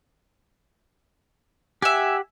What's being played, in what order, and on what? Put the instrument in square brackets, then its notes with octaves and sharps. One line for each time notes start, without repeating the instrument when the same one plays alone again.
[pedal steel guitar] G4 F#5 [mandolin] E5 G#5